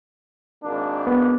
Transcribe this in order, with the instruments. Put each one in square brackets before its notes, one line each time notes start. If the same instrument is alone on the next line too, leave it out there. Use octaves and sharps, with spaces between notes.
[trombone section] G#1 A#3 D4
[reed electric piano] B3